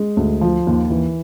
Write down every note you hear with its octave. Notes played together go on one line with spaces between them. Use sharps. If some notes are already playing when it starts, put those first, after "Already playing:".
Already playing: G#3
D2
F3
D#2
E3